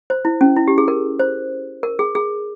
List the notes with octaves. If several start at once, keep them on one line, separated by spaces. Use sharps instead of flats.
C5
E4
C#4
E4
G4
G#4
A#4
C5
A#4
G#4
G#4